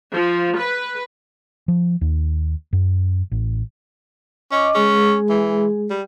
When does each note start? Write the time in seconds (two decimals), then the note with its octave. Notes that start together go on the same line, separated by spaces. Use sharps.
0.13 F3
0.60 B4
1.68 F3
2.01 D#2
2.73 F#2
3.32 A1
4.52 C#4 D#5 D6
4.75 G#3 C#4 G#4
5.30 E3
5.90 G3